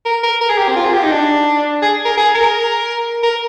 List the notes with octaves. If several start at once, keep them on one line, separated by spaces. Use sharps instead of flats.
A#4
A#4
A#4
G#4
G4
C4
F4
G#4
G4
D#4
D4
G#4
A#4
G#4
A#4
A#4